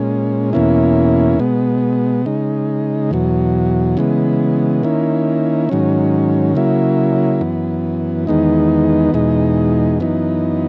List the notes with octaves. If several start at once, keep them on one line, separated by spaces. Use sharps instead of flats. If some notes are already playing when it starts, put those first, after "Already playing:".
Already playing: A#2 G#3 C#4
E2 B2 A#3 C#4 E4
B2 G#3 B3
C#3 G#3 D#4
E2 B2 F#3
C#3 E3 G#3 B3
D#3 A#3 C#4 E4
G#2 D#3 F#3 C#4
C#3 F#3 A#3 E4
F#2 E3 B3
E2 D#3 G#3 B3 D#4
E2 B2 G#3 D#4
F#2 E3 B3 D#4